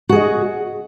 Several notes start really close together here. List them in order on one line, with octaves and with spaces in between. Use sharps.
F#4 G#4 D#5